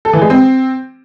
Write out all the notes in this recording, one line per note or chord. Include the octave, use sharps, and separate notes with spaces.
A4
E3
G#3
C4